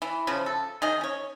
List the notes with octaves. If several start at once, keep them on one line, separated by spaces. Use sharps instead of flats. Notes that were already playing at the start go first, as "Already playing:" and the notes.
E3
C#3 F3
A4
D#3 G#4 D#5
C#4 C#5